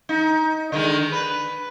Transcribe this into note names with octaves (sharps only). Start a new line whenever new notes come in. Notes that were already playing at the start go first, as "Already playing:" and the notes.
D#4
D3 D#3 G#3
B4